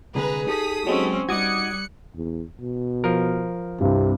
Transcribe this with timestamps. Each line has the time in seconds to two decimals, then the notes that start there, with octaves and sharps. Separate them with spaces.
0.15 C2 D3 G#3 G#4 B4 A#5
0.47 D#4 G4 A4 D#6 B6
0.87 F#3 G#3 C4 C#4
1.29 G3 D#4 F#4 D6 D#6 F#6 G#6 C#7
2.16 E2
2.61 B2
3.04 F3 A#4
3.81 C2 G2 C3